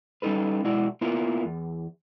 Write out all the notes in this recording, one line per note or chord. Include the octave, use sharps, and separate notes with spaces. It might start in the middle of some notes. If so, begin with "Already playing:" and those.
G3 C#4 D#4 A4 B4
B1 G#3 E4 F#4 D5
A#3 B3 E4 F4 A#4
E2